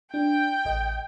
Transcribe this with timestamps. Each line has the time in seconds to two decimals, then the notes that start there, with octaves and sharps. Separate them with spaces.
0.14 D4 G5
0.65 A1 D#5